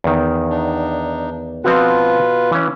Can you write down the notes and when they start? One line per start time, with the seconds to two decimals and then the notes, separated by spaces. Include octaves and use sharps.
0.04 E2 D#3
0.50 D4 D#4
1.64 B2 F3 C4 F4 F#4 B4
2.51 E3 C#4